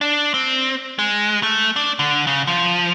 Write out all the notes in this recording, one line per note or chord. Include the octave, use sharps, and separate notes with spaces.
D4
C4
G#3
A3
D4
D3
C#3
F3